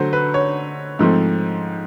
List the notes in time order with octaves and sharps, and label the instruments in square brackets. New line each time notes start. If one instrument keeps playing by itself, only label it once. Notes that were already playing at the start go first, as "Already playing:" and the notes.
Already playing: [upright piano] D3 F#3 A3 C5
B4
C#5
G#2 F3 A3 C4